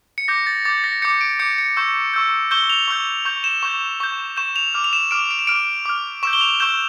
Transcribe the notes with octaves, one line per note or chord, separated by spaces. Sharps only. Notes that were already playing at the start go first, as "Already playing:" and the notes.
C#7
D6 G6 A#6
A6
D6 G6 A6
A#6
D6 G6 C#7
D7
D6 G6 C#7
C#7
C#6 E6 G6
C#6 E6 G6
C#6 E6 G6 G7
F7
C#6 E6 G6
C#6 G6
E7
C#6 G6
C#6 G6
C#6 G6 E7
F7
D6 F6
F7
E7
D6 F6 D7
D7
E7
D6 F6 D7
D6 F6
C#6 E6 G6 E7
G7
F7
C#6 E6 G6 E7